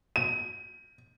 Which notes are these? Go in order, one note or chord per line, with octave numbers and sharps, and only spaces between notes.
D#7